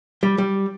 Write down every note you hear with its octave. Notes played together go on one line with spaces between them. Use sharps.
G3
G3